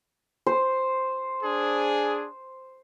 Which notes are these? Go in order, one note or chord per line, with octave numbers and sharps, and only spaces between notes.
C5
D4 G#4